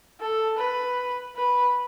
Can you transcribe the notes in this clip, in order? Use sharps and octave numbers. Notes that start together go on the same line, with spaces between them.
A4
B4
B4